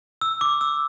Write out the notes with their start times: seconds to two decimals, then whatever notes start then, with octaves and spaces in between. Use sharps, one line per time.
0.21 E6
0.41 D6
0.61 E6